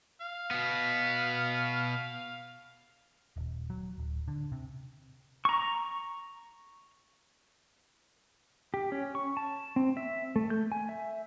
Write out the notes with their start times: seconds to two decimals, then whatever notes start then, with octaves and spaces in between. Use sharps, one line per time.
0.21 F5
0.51 B2 B3
3.36 D#1
3.70 F#3
3.98 D1
4.28 D3
4.52 C3
5.45 A#5 C#6
8.74 G4
8.92 C#4
9.15 C#6
9.37 A5
9.76 C4
9.97 E5
10.36 A3
10.50 G6
10.72 G#5
10.89 E5